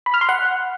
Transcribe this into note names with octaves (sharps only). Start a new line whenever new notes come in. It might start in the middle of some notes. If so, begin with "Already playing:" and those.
B5
F6
C6
F#5